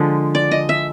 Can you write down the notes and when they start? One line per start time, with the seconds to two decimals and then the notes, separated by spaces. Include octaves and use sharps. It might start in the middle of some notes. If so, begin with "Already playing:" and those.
Already playing: D3 F3 G#3
0.35 D5
0.51 D#5
0.69 E5